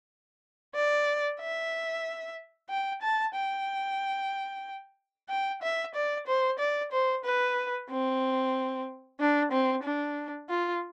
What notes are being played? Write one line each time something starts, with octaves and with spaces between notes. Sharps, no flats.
D5
E5
G5
A5
G5
G5
E5
D5
C5
D5
C5
B4
C4
D4
C4
D4
F4